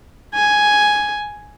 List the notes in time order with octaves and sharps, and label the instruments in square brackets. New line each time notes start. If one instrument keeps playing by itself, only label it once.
[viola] G#5